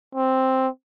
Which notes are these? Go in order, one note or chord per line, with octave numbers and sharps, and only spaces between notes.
C4